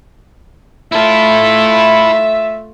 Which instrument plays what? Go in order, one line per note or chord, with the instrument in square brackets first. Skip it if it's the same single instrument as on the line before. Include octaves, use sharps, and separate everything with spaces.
[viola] A3 F4 [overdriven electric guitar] E4 A4 [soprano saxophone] E5